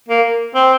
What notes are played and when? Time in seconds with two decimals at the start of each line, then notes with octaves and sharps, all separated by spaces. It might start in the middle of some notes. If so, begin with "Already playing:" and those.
0.09 A#3
0.55 C4